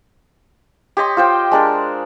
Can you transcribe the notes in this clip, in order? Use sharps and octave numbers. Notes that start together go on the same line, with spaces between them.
G4 C#5 D#5 C6
F4 C5 G5
G#3 D4 A#4